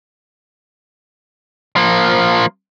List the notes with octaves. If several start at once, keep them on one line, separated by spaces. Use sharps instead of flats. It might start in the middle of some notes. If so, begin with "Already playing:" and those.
F3 A#3